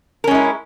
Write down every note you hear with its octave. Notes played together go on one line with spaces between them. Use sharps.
G#3 C#4 E4 A#4